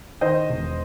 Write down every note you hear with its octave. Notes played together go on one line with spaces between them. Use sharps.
D#3 C5 D#5
E1